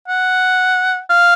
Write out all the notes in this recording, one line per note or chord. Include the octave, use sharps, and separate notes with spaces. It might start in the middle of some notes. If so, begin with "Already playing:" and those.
F#5
F5